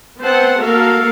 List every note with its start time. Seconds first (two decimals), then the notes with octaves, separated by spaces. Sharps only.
0.20 B3 C4 C5 F#5 A5
0.62 A#3 F#4 A4 A#4 F5